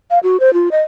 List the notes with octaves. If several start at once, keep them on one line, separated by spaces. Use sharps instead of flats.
F5
F#4
C5
F4
D#5